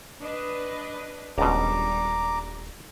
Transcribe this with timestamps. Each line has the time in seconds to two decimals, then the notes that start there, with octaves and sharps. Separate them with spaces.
0.22 D4 B4 D#5
1.38 D#1 C#2 B2 G3 D4 A#5 D6